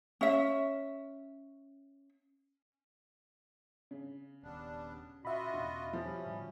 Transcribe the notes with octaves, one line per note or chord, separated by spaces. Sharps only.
C#4 E5
C#3
D#1 G3 B3 D4
A#2 F4 F#4 D#5 E5 B5
E2 B2 D4
F3 F#3 C#4 G4
A2 D3 G3